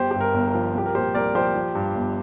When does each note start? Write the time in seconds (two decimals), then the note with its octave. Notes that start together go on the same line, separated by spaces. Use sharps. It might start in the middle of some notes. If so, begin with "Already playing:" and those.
Already playing: G1 G4 C5
0.11 G2 G4
0.21 A#4
0.34 G1
0.47 A#4
0.55 F3
0.74 C2 G4
0.86 A#4
0.95 A#2 G4 C5
1.14 C2 A#4 D5
1.35 F3 G4 C5
1.55 F3
1.75 G2
1.95 G1